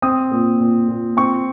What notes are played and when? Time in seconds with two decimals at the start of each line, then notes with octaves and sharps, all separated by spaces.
0.02 C4 D#6
0.31 A#2
0.60 A#2
0.88 A#2
1.17 C4 C#6